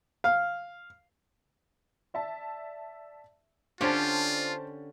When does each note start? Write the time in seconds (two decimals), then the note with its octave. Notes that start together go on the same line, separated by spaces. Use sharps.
0.24 F5
2.14 D5 E5 A5
3.81 D3 C#4 D4 F4 G4 C5 A5